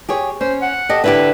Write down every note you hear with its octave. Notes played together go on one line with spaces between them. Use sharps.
G4 G#4 C#5
C#4 C5
F#5
G4 A4 D#5
D3 E4 G4 B4